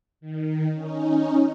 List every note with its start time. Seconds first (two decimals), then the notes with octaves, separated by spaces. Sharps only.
0.21 D#3
0.74 C#4 D#4